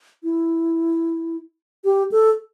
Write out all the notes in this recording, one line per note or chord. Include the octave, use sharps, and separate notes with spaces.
E4
G4
A4